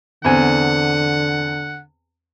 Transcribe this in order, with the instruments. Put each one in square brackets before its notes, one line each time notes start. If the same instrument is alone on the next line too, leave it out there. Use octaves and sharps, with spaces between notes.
[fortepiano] E2 C4 G#5 [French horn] D3 [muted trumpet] F#5